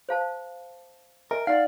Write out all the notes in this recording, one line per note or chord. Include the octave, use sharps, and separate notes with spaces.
C5 F5 A5
A#4 D#5 E5 G#5
D#4 D5 F5 F#5